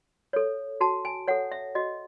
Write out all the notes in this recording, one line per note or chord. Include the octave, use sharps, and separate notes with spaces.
A4 C#5
F#4 A5
G#5
A4 C#5 F#5
E5
F#4 D#5